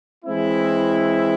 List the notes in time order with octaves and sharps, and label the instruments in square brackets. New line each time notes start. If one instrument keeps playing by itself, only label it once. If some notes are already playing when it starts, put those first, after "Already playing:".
[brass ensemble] E3 G#3 C4 E4